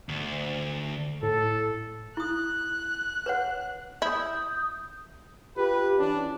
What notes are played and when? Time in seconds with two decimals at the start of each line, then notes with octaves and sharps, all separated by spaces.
0.09 D2
1.23 A2 A4
2.17 E4 D#6 F#6
3.26 B4 C#5 F#5
4.02 E4 D#6 G6
5.56 F4 G4 B4
5.98 E3 C#4 D4